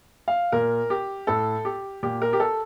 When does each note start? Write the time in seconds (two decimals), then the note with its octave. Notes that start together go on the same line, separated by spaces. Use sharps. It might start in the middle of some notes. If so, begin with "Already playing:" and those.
0.28 F5
0.52 A#2 A#4
0.90 G4
1.27 A2 A4
1.65 G4
2.03 A#2 G4
2.22 A#4
2.33 G4
2.40 A4